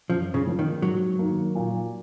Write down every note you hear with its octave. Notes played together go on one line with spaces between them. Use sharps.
F#2 F3
C#3
F3 A#3 C#4 F4
D#3
G#2 F#3
D#3 A#3
A#2